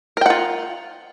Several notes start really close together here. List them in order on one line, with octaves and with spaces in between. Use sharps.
A#4 G5 F#5 F4